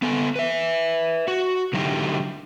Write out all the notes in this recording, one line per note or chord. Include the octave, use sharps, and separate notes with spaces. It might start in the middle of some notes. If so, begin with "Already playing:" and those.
B3 A4 G#5
B4 E5
F#4
D3 F#3 D#4 E4 G4